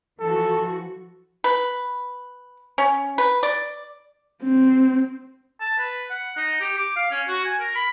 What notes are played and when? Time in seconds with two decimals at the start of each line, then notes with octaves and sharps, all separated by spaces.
0.20 E3 F3 F#4 A4
1.44 B4
2.78 C#4
3.18 B4
3.43 D5
4.43 C4
5.60 A5
5.79 B4
6.11 F#5
6.37 D#4
6.61 G4
6.78 D6
6.96 F5
7.11 C#4
7.28 F#4
7.45 G#5
7.60 A#4
7.76 B5